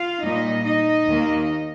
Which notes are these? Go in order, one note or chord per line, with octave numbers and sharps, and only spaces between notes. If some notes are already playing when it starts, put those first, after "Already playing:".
Already playing: F4 F5
A#2 G3 A#3 D#4 D#5
D#4 D#5
D#2 D#3 A#3